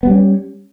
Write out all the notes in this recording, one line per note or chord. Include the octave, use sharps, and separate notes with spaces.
G3 B3 C#4